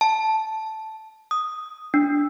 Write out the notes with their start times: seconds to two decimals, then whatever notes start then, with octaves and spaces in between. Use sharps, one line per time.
0.01 A5
1.31 D#6
1.94 D4